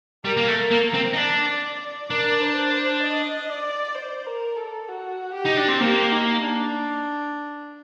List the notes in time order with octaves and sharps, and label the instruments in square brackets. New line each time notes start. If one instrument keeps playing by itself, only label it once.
[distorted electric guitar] G3 [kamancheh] A#4
[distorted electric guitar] A#3
A3
[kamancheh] A#4
[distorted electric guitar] A#3
[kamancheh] A#4
[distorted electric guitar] C4
D#4
[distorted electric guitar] D4 [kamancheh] D5
[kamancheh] D5
D5
[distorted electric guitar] D4 [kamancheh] A#4
[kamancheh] C5
C5
D#5
D5
C5
A#4
A4
F#4
G4
[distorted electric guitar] D#4
D4
C4
[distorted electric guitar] A#3 [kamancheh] G4
[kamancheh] D#4
D4